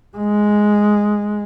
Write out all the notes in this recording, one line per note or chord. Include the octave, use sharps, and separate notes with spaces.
G#3